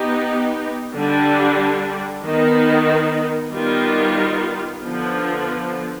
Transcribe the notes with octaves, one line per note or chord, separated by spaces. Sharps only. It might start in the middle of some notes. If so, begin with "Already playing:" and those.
Already playing: B3 D#4 G4
D3 G3 D4
D#3 B3 D#4
D#3 G3 B3 F4
D3 F3 B3